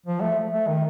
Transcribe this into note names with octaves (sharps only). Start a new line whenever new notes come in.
F3
A3
A3
D#3